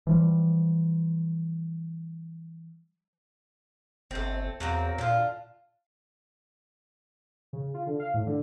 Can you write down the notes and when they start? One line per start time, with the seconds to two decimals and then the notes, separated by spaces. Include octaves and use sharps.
0.07 E3 F3 G3
4.11 G1 A3 C4
4.60 E2 F#3 A#3 C4
4.98 A#2 D3 F4
7.53 C#3
7.74 F4
7.87 D3
7.99 F5
8.14 A2
8.26 D3